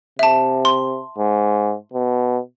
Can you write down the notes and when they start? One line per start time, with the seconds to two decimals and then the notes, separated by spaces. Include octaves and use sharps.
0.19 C3 E5 A5
0.65 C6
1.18 G#2
1.93 B2